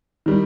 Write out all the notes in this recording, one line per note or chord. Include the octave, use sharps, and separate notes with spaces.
D#3 G3